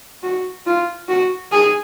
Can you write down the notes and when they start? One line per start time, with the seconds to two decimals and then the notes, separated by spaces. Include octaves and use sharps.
0.23 F#4
0.66 F4
1.08 F#4
1.52 G#4